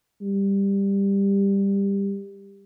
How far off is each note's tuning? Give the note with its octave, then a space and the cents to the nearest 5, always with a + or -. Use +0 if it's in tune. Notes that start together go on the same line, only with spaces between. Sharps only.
G3 +15